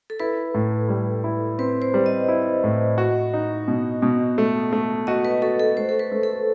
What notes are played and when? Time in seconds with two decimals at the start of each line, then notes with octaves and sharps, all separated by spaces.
0.10 A4
0.20 E4 B4
0.54 A2
0.89 G3
1.24 E4
1.58 C4 B4
1.82 C5
1.94 G3
2.06 D#5
2.28 E4
2.64 A2
2.98 F#4
3.34 D#4
3.68 B2
4.02 B2
4.38 A3
4.73 A3
5.07 F#4 D#5
5.25 B4
5.42 F#4 A4
5.60 A4
5.77 A3 C5
5.89 A4
5.99 B4
6.12 A3
6.23 A4